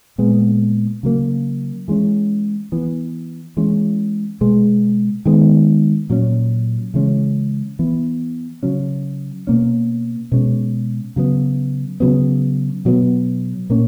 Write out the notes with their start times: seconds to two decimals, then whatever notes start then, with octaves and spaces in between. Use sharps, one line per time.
0.18 A#2 G#3 B3
1.03 C#3 F#3 A#3
1.88 E3 G#3 C#4
2.72 E3 B3
3.57 E3 G#3 C#4
4.41 B2 G#3 B3
5.25 D#3 G#3 B3
6.10 A#2 F#3 C#4
6.94 C#3 E3 G#3 C#4
7.79 E3 B3
8.63 C#3 F#3 C#4
9.47 B2 A#3 C#4
10.32 B2 G#3 C#4
11.16 C#3 F#3 B3
12.00 C#3 F#3 B3
12.85 B2 F#3 B3
13.70 A#2 A#3 C#4